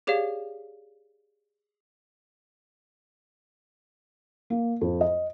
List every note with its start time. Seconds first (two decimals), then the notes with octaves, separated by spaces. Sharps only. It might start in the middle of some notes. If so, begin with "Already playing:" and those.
0.07 G4 G#4 C#5 D5 F5
4.50 A#3
4.81 F2
5.01 D#5